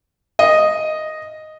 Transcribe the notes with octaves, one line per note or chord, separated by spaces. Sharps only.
D#5